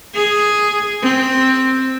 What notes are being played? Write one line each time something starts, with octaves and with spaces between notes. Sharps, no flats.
G#4
C4